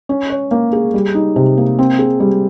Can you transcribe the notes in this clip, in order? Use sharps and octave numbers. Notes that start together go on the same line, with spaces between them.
C#4
C#5
A#3
G#4
G3
D#4
C3
A#3
C4
G#4
G3